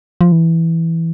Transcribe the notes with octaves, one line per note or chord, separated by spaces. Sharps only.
F3
E3